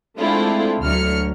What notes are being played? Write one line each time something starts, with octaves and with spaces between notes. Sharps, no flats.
G#3 A3 C4 D4 E4 F4
D2 D3 F#3 F6 C#7